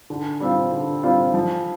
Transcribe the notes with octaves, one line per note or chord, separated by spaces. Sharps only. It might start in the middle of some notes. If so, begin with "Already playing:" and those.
D3
G3 C4 F4
D3
G3 C4 F4
F3